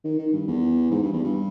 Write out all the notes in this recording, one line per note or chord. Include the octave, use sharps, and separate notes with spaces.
D#3
D#3
G2
E2
G#2
G2
E2
G2